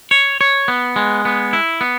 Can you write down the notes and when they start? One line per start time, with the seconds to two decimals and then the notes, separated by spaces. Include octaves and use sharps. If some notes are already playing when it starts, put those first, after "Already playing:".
0.11 C#5
0.41 C#5
0.68 B3
0.96 G#3
1.25 B3
1.53 E4
1.81 B3